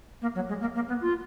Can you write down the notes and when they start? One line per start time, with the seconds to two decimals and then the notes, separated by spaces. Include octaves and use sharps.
0.21 A#3
0.35 F#3
0.48 G#3
0.60 A#3
0.74 A#3
0.88 B3
1.01 F4